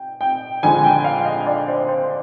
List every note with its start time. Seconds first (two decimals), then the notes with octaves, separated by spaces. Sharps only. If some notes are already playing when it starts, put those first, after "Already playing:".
Already playing: G5
0.21 G5
0.63 F2 D3 G#3 G#5
0.84 G5
1.04 F5
1.25 D#5
1.47 D5
1.68 C5
1.89 C5